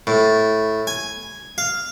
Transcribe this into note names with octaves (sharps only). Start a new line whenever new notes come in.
A2
G#5
F5